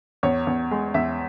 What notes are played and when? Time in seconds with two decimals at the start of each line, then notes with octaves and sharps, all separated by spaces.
0.23 E2 C#5
0.47 E2
0.71 G#3
0.94 E2 E5